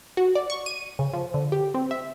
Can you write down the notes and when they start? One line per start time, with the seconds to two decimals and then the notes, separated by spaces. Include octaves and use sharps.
0.17 F#4
0.35 D5
0.50 C#6
0.66 D#7
0.99 C#3
1.13 F3
1.34 D3
1.52 G4
1.74 C4
1.91 E5